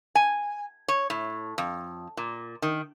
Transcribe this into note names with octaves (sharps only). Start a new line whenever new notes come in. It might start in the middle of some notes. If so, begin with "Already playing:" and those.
G#5
C#5
A2
F2
A#2
D#3